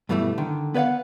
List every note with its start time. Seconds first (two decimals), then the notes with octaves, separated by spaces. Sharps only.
0.09 G2 B2 E3 G3 A3
0.38 D3 D#3
0.74 B3 B4 C#5 F5 F#5